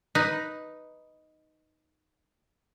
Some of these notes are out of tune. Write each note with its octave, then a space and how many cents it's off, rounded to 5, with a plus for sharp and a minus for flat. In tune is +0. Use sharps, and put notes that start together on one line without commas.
D#4 +0 B4 +0